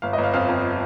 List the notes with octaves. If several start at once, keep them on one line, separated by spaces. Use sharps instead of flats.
G1 F5
D#5
G1
F5
F2 F5
F2